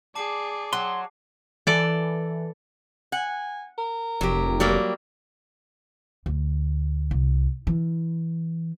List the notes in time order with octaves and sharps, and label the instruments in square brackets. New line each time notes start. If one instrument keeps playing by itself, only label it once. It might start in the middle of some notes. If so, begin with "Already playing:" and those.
[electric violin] G#4 D5 [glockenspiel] A5 D6 C7
[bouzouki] F#3 [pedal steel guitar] C6
[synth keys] E3 [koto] A4 D5
[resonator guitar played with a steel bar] F#5 [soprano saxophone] G#5
[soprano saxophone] A#4
[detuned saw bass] F1 [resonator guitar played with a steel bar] F#3 G4
[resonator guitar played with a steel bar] F#3 G3 A#3
[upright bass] D2
C2
E3